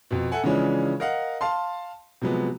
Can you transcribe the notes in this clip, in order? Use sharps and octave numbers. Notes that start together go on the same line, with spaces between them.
F2 B2
A4 E5 F#5 G#5
C#3 E3 F3 G#3 C#4 D4
A#4 D#5 F5 F#5
F5 A5 C6
C3 F3 F#3 G#3 B3